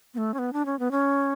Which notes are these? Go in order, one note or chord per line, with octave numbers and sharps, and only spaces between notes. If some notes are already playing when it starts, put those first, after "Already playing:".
B3
A3
C#4
B3
D4
C#4
B3
C#4